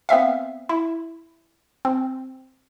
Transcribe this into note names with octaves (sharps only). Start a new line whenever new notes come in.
B3 C4 E5 F5
E4
C4